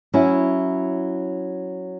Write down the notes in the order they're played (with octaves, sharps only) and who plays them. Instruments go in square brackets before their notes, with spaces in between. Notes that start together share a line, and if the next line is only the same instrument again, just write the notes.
[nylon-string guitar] F#3 C#4 E4